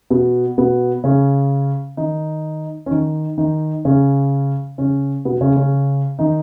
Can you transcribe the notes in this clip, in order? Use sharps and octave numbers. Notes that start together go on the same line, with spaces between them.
B2 B3
B2 B3
C#3 C#4
D#3 D#4
C#4
D#3 D#4
D#3 D#4
C#3 C#4
C#3 C#4
B2 B3
C#3 C#4
C#3 C#4
D#3 D#4